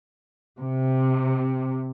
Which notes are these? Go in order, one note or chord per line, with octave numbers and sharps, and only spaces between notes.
C3